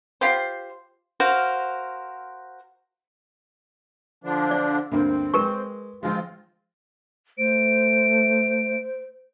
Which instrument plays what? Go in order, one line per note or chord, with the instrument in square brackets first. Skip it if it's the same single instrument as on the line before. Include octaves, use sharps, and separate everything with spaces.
[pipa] F4 G4 C5
[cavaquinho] F#4 A#4 C5 F5
[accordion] D3 F3 D4
[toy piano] D5
[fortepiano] D2 G2 A#3 [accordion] C4
[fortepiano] G#3 [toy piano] A#4 B4 C#6
[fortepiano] F3 G#3 [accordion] C4 F4
[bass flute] A3 [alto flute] C5 [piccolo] D7